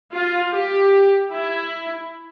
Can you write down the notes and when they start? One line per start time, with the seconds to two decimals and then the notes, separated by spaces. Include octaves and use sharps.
0.12 F4
0.52 G4
1.31 E4